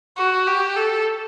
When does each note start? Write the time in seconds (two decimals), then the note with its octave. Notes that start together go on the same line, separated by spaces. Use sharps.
0.17 F#4
0.47 G4
0.76 A4